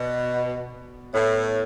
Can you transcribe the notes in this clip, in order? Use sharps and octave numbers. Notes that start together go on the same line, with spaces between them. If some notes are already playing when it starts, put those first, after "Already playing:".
Already playing: B2 B3 F#4 B4 D5
A2 B3 E4 A4 C#5